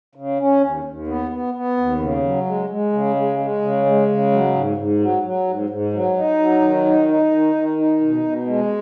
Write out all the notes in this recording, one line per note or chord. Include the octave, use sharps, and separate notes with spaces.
C#3
C#4
D#2
D#2
B3
B3
B3
D#2
C#3
F#3
G#3
G#3
C#3
G#3
G#3
C#3
G#3
C#3
F#3
G#2
G#2
F#3
F#3
G#2
G#2
F#3
D#4
F#3
D#3
D#4
D#4
D#3
D#3
D#4
B2
B2
G#3